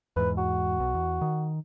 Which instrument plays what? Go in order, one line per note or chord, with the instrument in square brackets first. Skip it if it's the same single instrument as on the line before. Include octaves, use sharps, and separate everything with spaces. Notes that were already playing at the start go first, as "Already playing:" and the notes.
[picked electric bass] E2 G#2 [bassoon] B4
[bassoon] F#4
[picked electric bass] B1 B2
E2
D#3